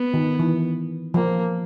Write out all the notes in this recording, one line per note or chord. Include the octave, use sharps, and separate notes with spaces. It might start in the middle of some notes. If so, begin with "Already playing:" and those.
Already playing: B3
D#3
E3
F3 A#3